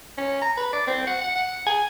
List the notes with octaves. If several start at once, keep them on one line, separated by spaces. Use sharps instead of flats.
C#4
A#5
B4
D5
C4
F#5
F#5
F#5
G#5